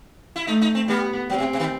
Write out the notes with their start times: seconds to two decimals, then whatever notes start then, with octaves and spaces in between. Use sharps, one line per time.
0.36 E4
0.47 A3 D#4
0.62 D#4
0.75 C4
0.88 G3 B3
1.29 F#3 C4
1.39 C3
1.53 C3
1.60 D#3